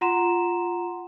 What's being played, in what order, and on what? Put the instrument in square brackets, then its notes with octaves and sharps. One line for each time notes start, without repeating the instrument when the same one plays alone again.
[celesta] F4 F#5 A#5 C6 E7